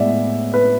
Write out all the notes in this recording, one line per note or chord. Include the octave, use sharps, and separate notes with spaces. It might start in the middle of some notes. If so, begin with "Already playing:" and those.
Already playing: A2 G#3 B3 D5 E5
B4